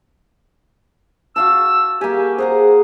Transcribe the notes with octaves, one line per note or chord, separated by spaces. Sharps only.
F#4 F5 A5 E6
A#3 G4 G#5
G#4 C5 F#5 A#5